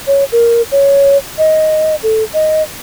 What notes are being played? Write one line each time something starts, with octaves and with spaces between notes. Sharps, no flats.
C#5
A#4
C#5
D#5
A4
D#5